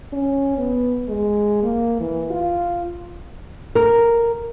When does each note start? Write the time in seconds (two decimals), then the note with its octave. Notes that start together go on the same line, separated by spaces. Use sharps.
0.13 C#4
0.58 B3
1.08 G#3
1.63 A#3
2.01 E3
2.31 F4
3.75 A#4